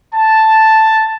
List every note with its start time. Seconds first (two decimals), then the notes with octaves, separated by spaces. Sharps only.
0.13 A5